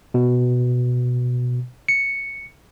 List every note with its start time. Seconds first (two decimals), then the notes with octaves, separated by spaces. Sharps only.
0.14 B2
1.88 C#7